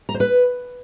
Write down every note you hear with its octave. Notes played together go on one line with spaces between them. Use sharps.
A#5
C5
B4